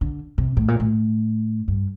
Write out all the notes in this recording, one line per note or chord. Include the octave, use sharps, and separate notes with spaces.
D3
C3
A2
A#2
A2
G2